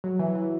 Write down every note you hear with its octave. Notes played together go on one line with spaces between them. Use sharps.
F#3
E3
E3